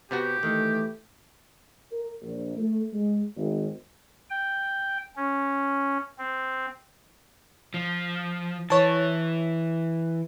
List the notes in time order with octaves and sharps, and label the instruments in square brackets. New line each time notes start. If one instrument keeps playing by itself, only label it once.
[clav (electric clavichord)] C3 B3 F#4 [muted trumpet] G4
[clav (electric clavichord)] D#3 [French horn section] E3 A3
[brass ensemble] A#4
A#1
A3
G#3
G#1
[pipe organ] G5
C#4
C4
[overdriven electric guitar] F3
[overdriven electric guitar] E3 [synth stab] C#5 A5